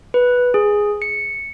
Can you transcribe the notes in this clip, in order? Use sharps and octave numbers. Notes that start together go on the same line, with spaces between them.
B4
G#4
C#7